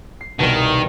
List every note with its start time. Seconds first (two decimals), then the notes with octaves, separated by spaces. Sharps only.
0.21 C7
0.39 C2 B2 D#3